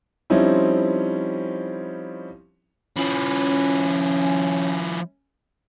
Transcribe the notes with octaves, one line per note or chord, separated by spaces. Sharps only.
F3 G3 C4 C#4 D#4 E4
F3 C#4 E4